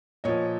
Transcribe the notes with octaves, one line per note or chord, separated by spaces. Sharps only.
A#2 F3 C#5 D#5